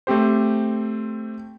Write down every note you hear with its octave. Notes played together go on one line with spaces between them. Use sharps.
A3 C4 G4 C5